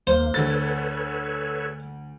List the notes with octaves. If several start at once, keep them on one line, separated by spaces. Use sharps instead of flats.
D#2 A#3 C5
D2 A4 B4 C#5 A6